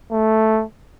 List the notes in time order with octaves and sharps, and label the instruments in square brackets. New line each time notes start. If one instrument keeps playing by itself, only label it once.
[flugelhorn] A3